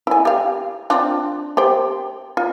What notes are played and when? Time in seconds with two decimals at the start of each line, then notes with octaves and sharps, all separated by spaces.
0.07 E4 G#5
0.25 G4 F5
0.90 C4 D4 F4
1.57 G4 C5 G5
2.37 F4